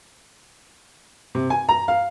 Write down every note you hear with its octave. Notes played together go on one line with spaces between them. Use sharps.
C3
G#5
A#5
F5